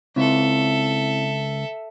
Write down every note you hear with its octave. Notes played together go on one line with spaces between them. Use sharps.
C#2 C4 E4 A4 E5